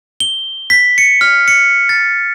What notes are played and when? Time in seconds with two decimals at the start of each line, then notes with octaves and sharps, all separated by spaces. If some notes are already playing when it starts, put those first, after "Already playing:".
0.20 G7
0.70 B6
0.98 C#7
1.21 F6
1.48 C#7
1.89 A6